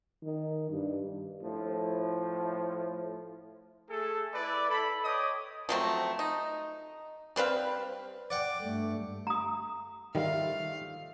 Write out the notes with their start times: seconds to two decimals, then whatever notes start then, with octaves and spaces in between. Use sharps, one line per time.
0.23 D#3
0.70 G2
1.43 A2 F3
3.90 A3 G#4 A4
4.34 E4 B4 D5
4.70 A4 B5
5.04 C#5 D#5 G5 D6 D#6
5.69 F3 F#3 A3 C4
6.19 D#4
7.36 G3 C4 B4 F5
8.30 D5 F#5 G5 D6
8.62 G2 A3
9.27 A#5 D#6
10.15 D#3 F3 G3 A3 F5